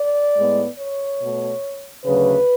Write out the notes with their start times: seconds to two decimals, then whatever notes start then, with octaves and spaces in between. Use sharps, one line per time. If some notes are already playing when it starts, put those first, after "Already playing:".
Already playing: D5
0.36 A2 G#3 B3
0.78 C#5
1.21 B2 A3
2.06 D2 C#3 F#3 B4